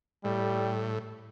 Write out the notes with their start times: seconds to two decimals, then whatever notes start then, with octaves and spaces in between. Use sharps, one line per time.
0.24 A2 G3